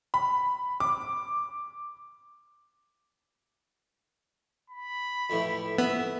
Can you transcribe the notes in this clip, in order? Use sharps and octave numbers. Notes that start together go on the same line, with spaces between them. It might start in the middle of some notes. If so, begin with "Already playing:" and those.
B5
D6
B5
F2 A2 E3
B3 E5